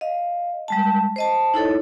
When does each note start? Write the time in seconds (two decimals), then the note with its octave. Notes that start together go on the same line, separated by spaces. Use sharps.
0.01 D#5 F5
0.68 G3 G#3 A5
1.16 C5 D#5 A5
1.54 D#4 E4 A4 C#5